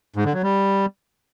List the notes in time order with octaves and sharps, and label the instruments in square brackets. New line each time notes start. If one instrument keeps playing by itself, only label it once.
[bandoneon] G#2
D3
F#3
G3